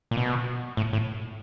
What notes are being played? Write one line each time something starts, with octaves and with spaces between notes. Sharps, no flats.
A#2
B2
A2
A2